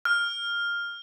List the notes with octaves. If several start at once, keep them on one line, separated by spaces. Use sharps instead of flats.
F6